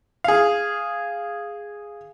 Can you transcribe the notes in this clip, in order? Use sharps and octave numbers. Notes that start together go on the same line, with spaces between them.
G#4 F5